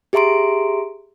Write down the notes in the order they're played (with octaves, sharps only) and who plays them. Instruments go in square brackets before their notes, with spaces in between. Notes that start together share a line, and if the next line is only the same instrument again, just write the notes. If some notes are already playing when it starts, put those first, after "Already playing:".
[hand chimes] G4 G#4 E5 A#5 C6 D7